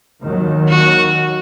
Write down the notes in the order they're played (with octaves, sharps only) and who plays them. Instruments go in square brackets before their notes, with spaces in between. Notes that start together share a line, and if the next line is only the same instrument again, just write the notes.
[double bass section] D#2 D#3 F#3
[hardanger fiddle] F#4